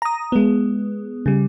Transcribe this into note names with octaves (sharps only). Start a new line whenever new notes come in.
A#5 D#6
G#3 B3
C#3 G3